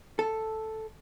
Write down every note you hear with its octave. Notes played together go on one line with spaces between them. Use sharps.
A4